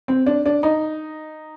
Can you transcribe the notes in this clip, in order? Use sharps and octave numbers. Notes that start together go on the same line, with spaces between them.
C4
D4
D4
D#4